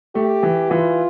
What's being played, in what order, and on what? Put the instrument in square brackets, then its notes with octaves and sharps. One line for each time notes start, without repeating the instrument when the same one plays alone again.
[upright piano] A3 [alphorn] G4
[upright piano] E3
[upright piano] E3 [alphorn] F4